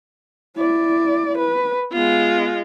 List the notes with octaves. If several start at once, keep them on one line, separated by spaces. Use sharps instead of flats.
E4 D5
B4
G#3 B3 F4